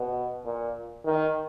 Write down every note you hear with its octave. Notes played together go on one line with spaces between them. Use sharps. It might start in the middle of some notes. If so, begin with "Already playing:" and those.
Already playing: B2
A#2
D#3